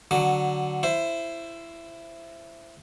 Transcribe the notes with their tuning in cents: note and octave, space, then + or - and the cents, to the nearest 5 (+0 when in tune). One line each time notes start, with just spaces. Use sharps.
D3 +0 F#3 +0 D6 +40
E4 +20 C5 +5